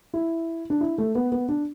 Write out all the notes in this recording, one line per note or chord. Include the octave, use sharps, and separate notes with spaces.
E4
D4
E4
A3
B3
B3
D4